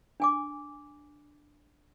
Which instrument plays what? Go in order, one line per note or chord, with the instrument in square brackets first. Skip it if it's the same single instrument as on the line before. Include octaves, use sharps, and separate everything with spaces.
[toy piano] D4 G#5 D6